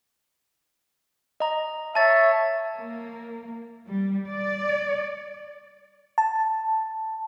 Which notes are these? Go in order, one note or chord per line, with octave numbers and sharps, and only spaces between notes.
D#5 A#5
C#5 E5 A5 A6
A#3
G3
D5
A5